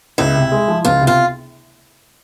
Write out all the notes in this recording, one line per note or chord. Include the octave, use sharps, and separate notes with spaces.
C#2 E4
C3
G#3
F3
C#2 F4
C3
F4